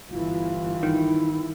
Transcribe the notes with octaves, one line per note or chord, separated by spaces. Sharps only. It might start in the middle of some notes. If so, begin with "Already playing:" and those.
G1 E3 E4 F4
D#3 E4